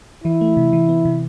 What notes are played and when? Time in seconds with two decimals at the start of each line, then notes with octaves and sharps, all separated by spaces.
0.24 E3 E4
0.41 A3
0.57 C3
0.73 E3
0.89 B3
1.05 C3